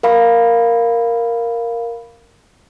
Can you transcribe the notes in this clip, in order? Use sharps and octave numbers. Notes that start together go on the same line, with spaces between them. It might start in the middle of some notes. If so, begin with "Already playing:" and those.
A#4 F5 B5